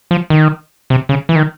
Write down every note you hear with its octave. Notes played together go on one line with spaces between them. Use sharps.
F3
D#3
C3
C#3
E3
D#3